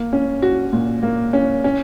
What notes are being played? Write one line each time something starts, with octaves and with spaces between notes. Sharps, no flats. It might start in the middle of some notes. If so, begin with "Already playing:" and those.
Already playing: A#3
C#4
F#4
A#2
A#3
C#4
C#4